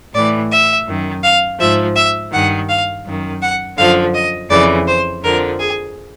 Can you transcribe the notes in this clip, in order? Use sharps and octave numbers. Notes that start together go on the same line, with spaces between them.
A2 E3 D5
E5
F#2 D#3
F5
G#2 F3 E5
E5
G2 D#3 F#5
F5
F#2 D#3
F#5
F#2 D3 F3 F5
D#5
F2 C#3 E3 D5
C5
F2 D3 F3 A#4
G#4